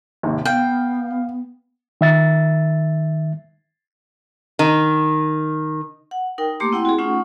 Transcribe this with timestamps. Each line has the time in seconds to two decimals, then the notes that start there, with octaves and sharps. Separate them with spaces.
0.23 G#1 D#2 C3
0.45 B3 F5 G5
2.01 D#3 E5 A6
4.59 D#3
6.11 F#5
6.38 D#4 A#4 G5
6.60 A3 A#3 G4 C6 D6
6.72 C4 E4 F#5 G5 C6
6.85 F#4 G#4
6.98 A3 C#4 D#4 F4 F#5 C#6